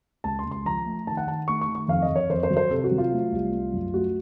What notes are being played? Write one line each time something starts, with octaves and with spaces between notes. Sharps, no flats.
C#2 A5
C6
C#2
C6
F3 A#5
A3
D#3 A5
F#5
D#3 A5
A3 C#6
C#6
D#3
C#6
F2 F5
D#5
F2
C#5
F2 C5
C5
F#3
C5
C3 A4
F#4
F#3
F4
A3
C2
A3
F#2
A3 F#4